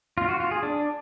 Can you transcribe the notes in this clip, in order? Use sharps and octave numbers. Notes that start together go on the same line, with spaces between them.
F4
F#4
F4
G#4
D4